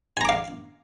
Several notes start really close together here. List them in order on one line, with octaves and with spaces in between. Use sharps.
G#5 A#5 D6 F5